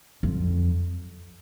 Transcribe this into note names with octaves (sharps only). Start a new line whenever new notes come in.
F2